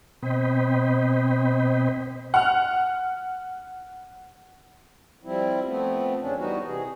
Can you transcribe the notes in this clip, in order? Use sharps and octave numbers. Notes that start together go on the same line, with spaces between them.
B2 C4 C5 D#5 G5 B5
F#5 F6
F3 G3 C4 E4
F3 A3 B3 C4
E2 C#3 C#4 D4
E3 G3 B3 D#4 F#4
C3 E3 G#4